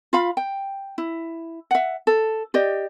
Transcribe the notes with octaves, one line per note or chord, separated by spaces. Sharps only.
F4 F5 B5
G5
E4
E5 F#5
A4
G4 D5 D#5